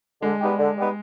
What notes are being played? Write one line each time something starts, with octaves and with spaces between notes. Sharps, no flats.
D3 G#3
G3 B3 D#4 G4
D3
G3 B3 D#4 G4